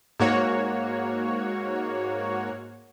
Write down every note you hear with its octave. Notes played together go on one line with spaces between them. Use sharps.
G#2 A#3 F#4 C#5